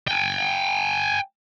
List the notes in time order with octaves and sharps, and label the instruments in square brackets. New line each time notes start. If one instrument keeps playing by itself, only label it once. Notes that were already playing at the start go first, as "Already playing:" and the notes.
[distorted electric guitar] G5 G#5